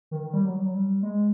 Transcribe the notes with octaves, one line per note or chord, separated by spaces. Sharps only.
D#3
D#3
G3
F#3
G3
F#3
G3
G#3